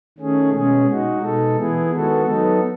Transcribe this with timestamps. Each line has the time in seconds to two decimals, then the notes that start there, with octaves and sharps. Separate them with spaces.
0.18 D#3 A3 C#4 G#4
0.52 B2 G#3 C#4 G#4
0.87 G#3 D#4 F#4
1.21 B2 G#3 D#4 A4
1.57 E3 B3 E4 G#4
1.91 D#3 G#3 B3 F#4 A4
2.25 F#3 B3 D#4 A4